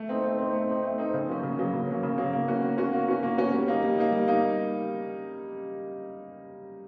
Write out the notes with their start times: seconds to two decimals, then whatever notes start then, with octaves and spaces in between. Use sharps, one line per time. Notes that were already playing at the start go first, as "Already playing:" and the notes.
Already playing: A3
0.09 C4 D#4
0.24 A3
0.38 C4 D#4
0.53 A3
0.68 C4 D#4
0.83 A3
0.98 C4 D#4
1.13 C#3
1.29 F#3 A#3 C#4
1.43 C#3
1.59 F#3 A#3 C#4
1.73 C#3
1.88 F#3 A#3 C#4
2.03 C#3
2.18 F#3 A#3 C#4
2.33 A#3
2.48 C#4 F#4
2.63 A#3
2.78 C#4 F#4
2.93 A#3
3.08 C#4 F#4
3.23 A#3
3.38 C#4 F#4
3.53 G3
3.68 A#3 D#4
3.83 G3
3.98 A#3 D#4
4.12 G3
4.28 A#3 D#4